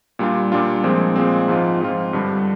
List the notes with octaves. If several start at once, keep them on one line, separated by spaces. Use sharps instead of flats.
A#2 G3 D4 F4
A#2 G3 D4 F4
A#2 F3 G#3 C4
A#2 F3 G#3 C4
G#2 F3 C4 F4
G#2 F3 C4 F4
G2 D3 G3 D4